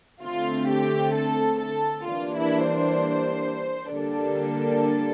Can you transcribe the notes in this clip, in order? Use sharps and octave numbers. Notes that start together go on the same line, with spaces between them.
D3 A3 C4 F4
G4
A4
A4
E3 G3 A#3 D4 F4
E4
C5
D3 G3 A#3 D4 A4